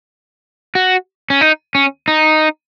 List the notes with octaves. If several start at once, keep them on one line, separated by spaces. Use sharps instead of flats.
F#4
C#4
D#4
C#4
D#4